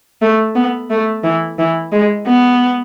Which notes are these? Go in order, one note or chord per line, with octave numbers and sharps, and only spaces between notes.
A3
B3
A3
E3
E3
G#3
B3